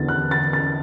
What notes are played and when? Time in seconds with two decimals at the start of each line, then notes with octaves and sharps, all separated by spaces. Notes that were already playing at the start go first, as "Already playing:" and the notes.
Already playing: E2 D3 A6
0.09 F#6
0.31 A6
0.53 A6